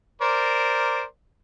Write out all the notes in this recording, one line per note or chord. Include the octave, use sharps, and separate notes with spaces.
A#4 C5 D5